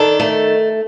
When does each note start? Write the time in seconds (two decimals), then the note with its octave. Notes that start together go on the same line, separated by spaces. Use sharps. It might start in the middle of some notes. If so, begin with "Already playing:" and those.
Already playing: D#3 D4 A4
0.20 A3